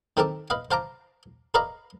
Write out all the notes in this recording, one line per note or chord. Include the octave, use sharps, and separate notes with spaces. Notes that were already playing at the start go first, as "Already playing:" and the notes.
D#3 C4 A4 A#4 A5 D6
B4 D#5 F5
C5 F5 A5 A#5 D6
A#4 B4 D5 D#5 F5 A#5